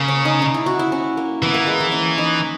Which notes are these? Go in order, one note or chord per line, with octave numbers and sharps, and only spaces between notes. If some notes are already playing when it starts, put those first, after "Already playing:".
Already playing: C#3 A#3
C#4
D#4
D#4
E4
F#4
E4
C#4
A#3
E3 B3
A#3
G#3
A#3
C#4
D#4